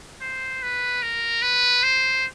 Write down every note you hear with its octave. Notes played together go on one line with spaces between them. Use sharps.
C5
B4
A#4
B4
C5